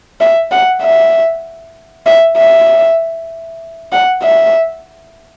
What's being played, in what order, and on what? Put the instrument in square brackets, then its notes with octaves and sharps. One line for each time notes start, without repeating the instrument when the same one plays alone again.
[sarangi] E5
F#5
E5
E5
E5
F#5
E5